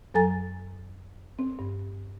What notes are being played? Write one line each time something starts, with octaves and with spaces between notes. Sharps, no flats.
F#2 F#3 A4 G#5 A#5 A6
C4
G2